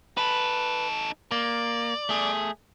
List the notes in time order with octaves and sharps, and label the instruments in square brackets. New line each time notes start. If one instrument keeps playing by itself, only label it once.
[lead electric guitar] D#4 A4 [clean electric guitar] B4
[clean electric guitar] A#3 [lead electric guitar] D5
[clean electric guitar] A3 G#4